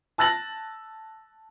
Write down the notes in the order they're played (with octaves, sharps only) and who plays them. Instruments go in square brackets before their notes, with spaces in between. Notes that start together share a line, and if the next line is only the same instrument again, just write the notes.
[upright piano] A5 E6 F#6 A6 A#6 F#7